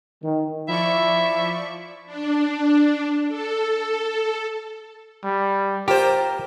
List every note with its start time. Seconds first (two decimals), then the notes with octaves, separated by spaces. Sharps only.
0.24 D#3
0.68 F3 E4 D5 E5 C#6
2.06 D4
3.28 A4
5.24 G3
5.88 F4 G4 A#4 C5